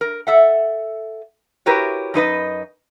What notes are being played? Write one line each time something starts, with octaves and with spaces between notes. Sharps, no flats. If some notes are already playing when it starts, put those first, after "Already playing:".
A#4
A4 E5 F#5
E4 F#4 G4 A#4 B4 C#5
F#2 D#4 B4 D#5